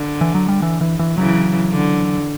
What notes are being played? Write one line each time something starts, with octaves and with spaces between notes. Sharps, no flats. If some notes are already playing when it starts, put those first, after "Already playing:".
Already playing: D3
E3
F#3
G3
E3
E3
E3
C#3 E3 F#3
D3